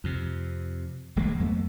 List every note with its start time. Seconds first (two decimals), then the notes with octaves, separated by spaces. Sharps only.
0.04 F2 C3
1.16 D1 A1 G#3 A#3
1.40 F2 F#3 A3 B3